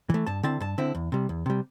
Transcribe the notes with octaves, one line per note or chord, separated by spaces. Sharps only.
E3 A3
G2 A5
D3 C4 E4 A5
G2 A5
D3 C4 E4
E2
C3 G3
E2
C3 G3